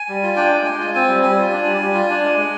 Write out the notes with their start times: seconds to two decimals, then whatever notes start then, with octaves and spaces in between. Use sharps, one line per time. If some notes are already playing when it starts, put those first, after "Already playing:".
Already playing: G#5
0.09 G3
0.23 F4
0.36 D4 G5
0.51 G#3
0.65 G#3 G#5
0.80 F4
0.94 C4 G#5
1.09 G3
1.23 G3 G#5
1.38 F4
1.52 D4
1.65 G3
1.81 G3
1.94 F4
2.10 D4
2.24 G#3
2.38 G#3